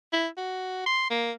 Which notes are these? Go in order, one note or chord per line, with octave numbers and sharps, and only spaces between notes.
E4
F#4
C6
A#3